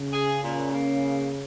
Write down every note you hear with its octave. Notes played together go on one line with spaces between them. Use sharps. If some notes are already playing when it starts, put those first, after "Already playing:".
Already playing: C#3
G#4
A#2
A#3